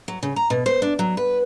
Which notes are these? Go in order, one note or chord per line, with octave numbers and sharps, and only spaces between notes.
F#3
C#3
A#5
B2
C5
D4
F#3
B4